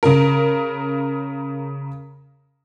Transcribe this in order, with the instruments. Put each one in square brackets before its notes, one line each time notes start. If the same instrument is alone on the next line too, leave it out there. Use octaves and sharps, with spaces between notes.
[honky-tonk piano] C#3 A#4